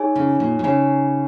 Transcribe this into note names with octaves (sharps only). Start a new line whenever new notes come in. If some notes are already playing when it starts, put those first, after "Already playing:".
Already playing: D#4 G#4 C#5 G#5
C#3
A#2
A#2
C#3 D#4 G#4 C#5 G#5